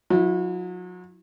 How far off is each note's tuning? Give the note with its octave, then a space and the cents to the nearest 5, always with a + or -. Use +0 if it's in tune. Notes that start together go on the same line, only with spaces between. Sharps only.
F#3 -35 E4 +0